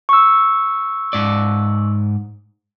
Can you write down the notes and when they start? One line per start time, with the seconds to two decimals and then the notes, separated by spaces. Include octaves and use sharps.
0.09 C#6 E6
1.13 G#2 D5